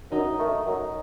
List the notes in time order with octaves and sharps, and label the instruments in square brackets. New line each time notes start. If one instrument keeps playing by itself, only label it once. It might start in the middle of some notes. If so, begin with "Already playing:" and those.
[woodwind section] F#2 [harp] D#4
[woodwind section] D#3 A3
F#2